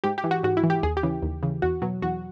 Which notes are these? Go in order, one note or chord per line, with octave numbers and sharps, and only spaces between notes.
G#2 G4
G4
E3
F#4
G#2 F#4
E4
E3
G4
D#2 G#4
G4
C#3 E3
D#2
C#3 E3
E2 F#4
B2 F#3
E2 F#4